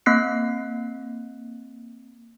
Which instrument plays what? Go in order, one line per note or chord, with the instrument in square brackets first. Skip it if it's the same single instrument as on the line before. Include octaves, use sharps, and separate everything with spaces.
[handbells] A#3 C4 F#6 C7